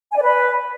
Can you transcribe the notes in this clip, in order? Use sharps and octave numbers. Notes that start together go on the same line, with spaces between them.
G#5
D5
B4